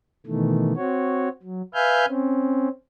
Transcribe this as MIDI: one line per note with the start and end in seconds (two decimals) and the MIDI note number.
0.26 0.73 47
0.26 0.73 51
0.26 0.73 52
0.26 0.73 57
0.76 1.29 60
0.76 1.29 66
0.76 1.29 73
1.43 1.62 54
1.74 2.06 71
1.74 2.06 76
1.74 2.06 77
1.74 2.06 80
1.74 2.06 89
1.74 2.06 91
2.07 2.68 60
2.07 2.68 61